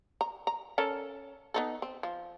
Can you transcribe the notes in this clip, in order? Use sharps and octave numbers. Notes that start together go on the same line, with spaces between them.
A#5
A#5
C#4 A4 A#4
B3 D#4 A4
C4
F3